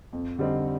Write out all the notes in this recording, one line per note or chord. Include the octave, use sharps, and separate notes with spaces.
F2
D3 G3 C4 D#4